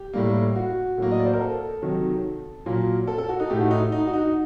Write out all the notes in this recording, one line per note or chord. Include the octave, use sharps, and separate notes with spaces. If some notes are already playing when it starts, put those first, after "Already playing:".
Already playing: G4
A2 G3 A#3
F#4
A2 F#3 A#3
D#5
D5
C5
A#4
A4
C3 D#3 F#3
A#2 F#3 A#3
A4
A4
F#4
D#4
A2 A3 G4
F#4
D#4
D#4
F#4
D#4